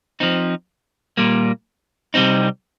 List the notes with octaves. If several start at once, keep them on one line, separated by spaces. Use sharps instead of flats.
F3 C4 D#4
A#2 G3 A#3
C3 G3 C4 D#4